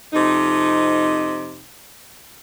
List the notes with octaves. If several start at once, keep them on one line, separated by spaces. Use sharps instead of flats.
F2 C3 D#4